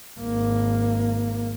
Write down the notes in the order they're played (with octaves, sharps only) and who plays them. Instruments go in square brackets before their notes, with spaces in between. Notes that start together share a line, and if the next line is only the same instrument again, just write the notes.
[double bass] G#1 A#3